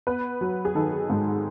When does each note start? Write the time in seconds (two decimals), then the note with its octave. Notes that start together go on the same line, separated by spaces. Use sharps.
0.07 B3 B4
0.41 F#3
0.65 G#4
0.75 D#3 A4
1.10 G#2